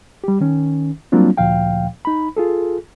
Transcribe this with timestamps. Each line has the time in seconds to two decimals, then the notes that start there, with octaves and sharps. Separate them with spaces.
0.24 G3 G4
0.41 D#3 C#4
1.12 F#3 G3 A#3 C4 D4 F4
1.37 D2 A#2 F3 F5 G5
2.05 D#4 B5
2.37 F4 G#4 A4